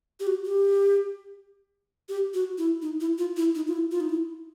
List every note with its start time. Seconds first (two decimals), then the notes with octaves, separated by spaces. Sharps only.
0.20 G4
0.27 F#4
0.45 G4
2.09 G4
2.34 F#4
2.58 E4
2.82 D#4
3.00 E4
3.18 F4
3.37 E4
3.55 D#4
3.67 F4
3.73 E4
3.91 F4
4.00 D#4
4.09 E4